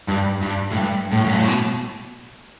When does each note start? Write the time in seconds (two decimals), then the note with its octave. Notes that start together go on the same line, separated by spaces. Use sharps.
0.08 G2
0.43 G2
0.72 A2
0.78 G2
1.13 A2
1.25 F#2
1.33 G2
1.39 A2
1.48 B2